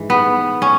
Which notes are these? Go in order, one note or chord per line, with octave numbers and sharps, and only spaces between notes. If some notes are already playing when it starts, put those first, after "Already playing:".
Already playing: G#2 E3
B3
C#4